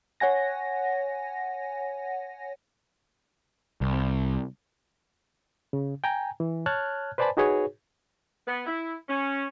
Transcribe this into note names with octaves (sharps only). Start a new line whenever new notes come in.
C#5 F#5 G#5 A#6
C2
C#3
G5 G#5 A#5
E3
C#5 A5 F6 F#6 G#6
B4 C5 D5 G#5 A5 B5
D#4 F#4 G#4 B4 C#5
B3
E4
C#4